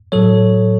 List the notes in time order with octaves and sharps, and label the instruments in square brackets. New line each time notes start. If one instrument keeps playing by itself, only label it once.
[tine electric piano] A2 F#3 A4 C#5